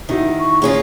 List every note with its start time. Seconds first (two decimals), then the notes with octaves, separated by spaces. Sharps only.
0.09 D#3 D#4 E4 F#4
0.39 C#6
0.62 A#3 C#4 F4 G#4